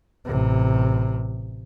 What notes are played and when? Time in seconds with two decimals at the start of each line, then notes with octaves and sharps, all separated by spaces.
0.25 A1 C3